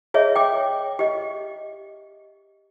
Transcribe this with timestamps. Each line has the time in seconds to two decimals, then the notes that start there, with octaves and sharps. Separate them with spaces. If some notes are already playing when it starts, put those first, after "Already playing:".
0.14 G#4 C#5 D#5 E5
0.35 G5 D6
0.99 G4 D#5